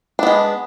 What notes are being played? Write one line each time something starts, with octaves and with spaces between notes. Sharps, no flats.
G#3 B3 D4